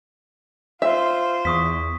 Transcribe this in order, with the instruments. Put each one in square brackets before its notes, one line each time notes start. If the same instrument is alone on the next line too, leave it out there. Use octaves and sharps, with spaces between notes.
[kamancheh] F4 C5 [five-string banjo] E5
[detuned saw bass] E2 [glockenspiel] C#6 D#6 B6